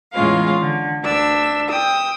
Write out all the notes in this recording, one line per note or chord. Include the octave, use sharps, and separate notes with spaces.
E2 A2 G#3 C#4 F4 F5
D3
D2 D4 E5 E6
G5 D#6 E6